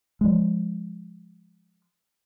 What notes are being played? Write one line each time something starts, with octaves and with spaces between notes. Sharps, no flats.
F3 G#3